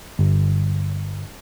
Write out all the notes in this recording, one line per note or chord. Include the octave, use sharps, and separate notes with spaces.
G1